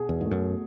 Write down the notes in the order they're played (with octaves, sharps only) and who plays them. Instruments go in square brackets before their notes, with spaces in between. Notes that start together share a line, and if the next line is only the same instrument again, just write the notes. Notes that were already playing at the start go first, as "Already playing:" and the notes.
Already playing: [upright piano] B2 G#4
[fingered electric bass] E2
[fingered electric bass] G#2 [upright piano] A3
[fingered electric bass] F#2